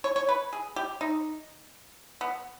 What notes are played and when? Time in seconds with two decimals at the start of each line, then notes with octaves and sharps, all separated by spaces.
0.04 C#5
0.16 C#5
0.29 B4
0.53 G#4
0.76 G4
1.01 D#4
2.21 B3